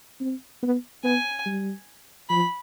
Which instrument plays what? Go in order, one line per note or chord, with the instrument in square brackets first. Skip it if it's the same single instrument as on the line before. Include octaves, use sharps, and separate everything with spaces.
[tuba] C4
B3
[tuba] B3 [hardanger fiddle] G#5
[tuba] G3
[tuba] F3 [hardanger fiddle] B5